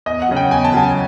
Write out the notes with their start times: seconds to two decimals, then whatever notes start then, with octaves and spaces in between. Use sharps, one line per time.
0.06 E2 D#5
0.22 F#5
0.29 C#3 F#3
0.36 G5
0.51 E2 G#5
0.64 A5
0.74 C#3 F#3 G#5